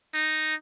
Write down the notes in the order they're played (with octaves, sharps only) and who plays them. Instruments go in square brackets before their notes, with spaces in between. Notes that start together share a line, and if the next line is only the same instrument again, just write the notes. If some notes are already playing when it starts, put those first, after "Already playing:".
[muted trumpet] D#4